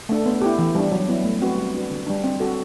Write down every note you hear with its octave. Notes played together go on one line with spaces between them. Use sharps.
A3 D4 A4
B3
E4 G4
E3
G3 D4
F#3
B3 E4
A3
C4 F#4 B4
G3
D4 F#4 B4
D3
G3 D4
C4
F#4 A4